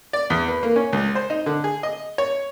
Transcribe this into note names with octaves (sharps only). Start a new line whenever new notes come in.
D5
E2
B4
A#3
C#4
C#2
C5
D#4
D3
G#4
D#5
C#5